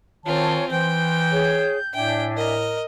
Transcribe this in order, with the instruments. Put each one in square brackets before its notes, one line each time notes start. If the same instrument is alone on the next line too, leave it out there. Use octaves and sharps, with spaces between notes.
[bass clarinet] D#3 [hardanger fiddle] C4 F4 [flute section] C#5 G#5 A5
[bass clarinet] E3 [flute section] C5 [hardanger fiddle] G5 [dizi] G6
[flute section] G#4 C#5
[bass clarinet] A2 [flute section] D4 E5 G#5 [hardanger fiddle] G5
[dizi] A#4 [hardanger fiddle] D#5